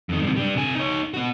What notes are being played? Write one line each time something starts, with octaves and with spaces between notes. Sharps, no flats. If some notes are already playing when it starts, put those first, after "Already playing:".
F2 D#3
G2 C3
G3 D4
C3 G#5
D#4 C#5
B3 F#4